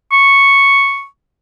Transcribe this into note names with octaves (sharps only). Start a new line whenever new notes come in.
C#6